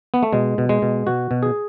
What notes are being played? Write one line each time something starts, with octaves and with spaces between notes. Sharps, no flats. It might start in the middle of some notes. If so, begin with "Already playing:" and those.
B3
A3
B2 G#3
B2
G#3
B2
B2 F#4
B2
G#4